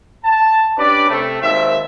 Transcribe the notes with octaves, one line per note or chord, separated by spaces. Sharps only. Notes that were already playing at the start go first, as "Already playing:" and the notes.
A5
C#4 D4 G4 B4 D5
C3 A3
G#1 D#2 D#3 C4 E5